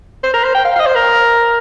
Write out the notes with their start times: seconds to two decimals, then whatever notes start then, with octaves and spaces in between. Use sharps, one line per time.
0.24 C5
0.34 A#4
0.44 C5
0.55 G5
0.65 F5
0.76 F5
0.80 D#5
0.86 C5
0.96 A#4